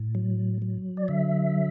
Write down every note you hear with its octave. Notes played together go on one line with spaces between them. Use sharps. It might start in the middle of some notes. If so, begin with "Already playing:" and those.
Already playing: A2
F#3
F#3
D5
D3 E5